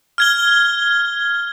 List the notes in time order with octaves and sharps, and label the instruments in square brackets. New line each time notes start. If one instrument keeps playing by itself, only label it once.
[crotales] F6 G#6 G7